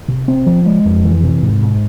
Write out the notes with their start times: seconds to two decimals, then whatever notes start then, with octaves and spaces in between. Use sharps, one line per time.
0.08 C3
0.28 C4
0.47 F3
0.66 G#3
0.85 F2
1.04 E3
1.23 C3
1.42 G#2
1.62 G#2